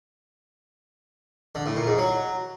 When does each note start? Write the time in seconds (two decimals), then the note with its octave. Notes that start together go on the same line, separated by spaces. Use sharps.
1.55 D3
1.66 A2
1.77 A#2
1.87 G#2
1.98 F#3